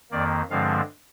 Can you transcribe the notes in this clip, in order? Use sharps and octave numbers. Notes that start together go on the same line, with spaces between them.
F2 D#3 A#3 D5
G2 D3 F3 G#3 C4 F5